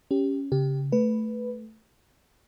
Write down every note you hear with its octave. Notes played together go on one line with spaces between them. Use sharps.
C#4 G4
C#3 G4
A3 B4